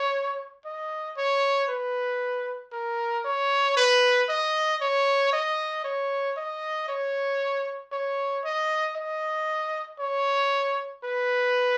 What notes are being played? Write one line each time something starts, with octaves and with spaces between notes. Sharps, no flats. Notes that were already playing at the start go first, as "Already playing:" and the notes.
Already playing: C#5
D#5
C#5
B4
A#4
C#5
B4
D#5
C#5
D#5
C#5
D#5
C#5
C#5
D#5
D#5
C#5
B4